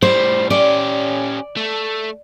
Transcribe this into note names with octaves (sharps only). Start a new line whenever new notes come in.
A2 G3 C5
C#4 G4 D5
A3